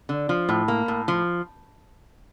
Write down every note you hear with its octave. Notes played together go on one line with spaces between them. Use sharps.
D3
F3
A2
A#3
A2
F3